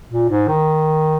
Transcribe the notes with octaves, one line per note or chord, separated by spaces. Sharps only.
A#2
G#2
D#3